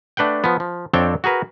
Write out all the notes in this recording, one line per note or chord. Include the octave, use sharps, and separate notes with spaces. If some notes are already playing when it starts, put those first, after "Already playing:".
A3 D4 B4 F#5 G5
F3 B3
F3
F2 C4 D4 A4 C#5 G5
F#4 G#4 A#4 B4